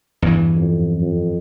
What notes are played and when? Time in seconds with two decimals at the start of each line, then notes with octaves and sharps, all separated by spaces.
0.22 E2 G2 E3
0.56 F2
1.01 F2